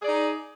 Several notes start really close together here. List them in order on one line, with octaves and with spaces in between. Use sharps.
G#4 D5 D#4